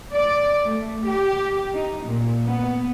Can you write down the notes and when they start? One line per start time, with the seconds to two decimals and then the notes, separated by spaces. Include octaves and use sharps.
0.13 D5
0.65 A3
1.07 G4
1.73 D#4
2.04 A#2
2.45 B3